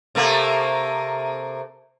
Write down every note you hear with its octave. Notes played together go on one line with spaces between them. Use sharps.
C3 A3 A#3